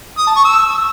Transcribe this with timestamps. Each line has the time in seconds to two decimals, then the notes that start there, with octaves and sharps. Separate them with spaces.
0.18 D#6
0.27 A5
0.36 C#6
0.45 E6